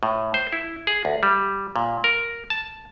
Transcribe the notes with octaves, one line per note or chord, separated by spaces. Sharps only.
A2
C5
E4
G#4
D2
G3
A#2
A#4
A5